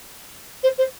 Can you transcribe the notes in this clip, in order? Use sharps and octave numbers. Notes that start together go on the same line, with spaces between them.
C5
C5